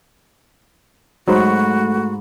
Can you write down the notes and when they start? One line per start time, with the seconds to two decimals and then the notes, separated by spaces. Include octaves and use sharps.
1.28 G#2 F#3 A3 D#4 F#4 C5 B5 C#6